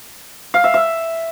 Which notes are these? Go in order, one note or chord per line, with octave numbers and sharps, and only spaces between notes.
F5
E5
E5